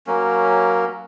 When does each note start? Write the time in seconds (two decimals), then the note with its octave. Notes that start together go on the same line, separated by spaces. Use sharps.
0.07 F#3 A#3 C#4